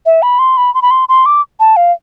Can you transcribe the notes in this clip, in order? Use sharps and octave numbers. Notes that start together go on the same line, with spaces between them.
E5
B5
C6
B5
C6
B5
C6
C6
D6
A5
F5